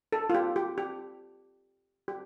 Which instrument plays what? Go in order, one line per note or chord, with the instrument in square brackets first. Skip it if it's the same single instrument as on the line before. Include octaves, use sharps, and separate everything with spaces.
[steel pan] A4
F4
G4
G4
G4
G4